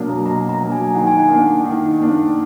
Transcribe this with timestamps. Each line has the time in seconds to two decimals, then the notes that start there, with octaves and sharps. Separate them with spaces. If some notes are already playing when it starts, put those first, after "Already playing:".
Already playing: B2 F#3 A#3 D4
0.09 A#5
0.25 B2 A#5
0.49 A#5
0.60 F#3 A#3 D4
0.72 G#5
0.95 D#3 F#5
1.07 G#5
1.19 F#5
1.29 A#3 D4
1.64 D#3
1.99 A#3 D4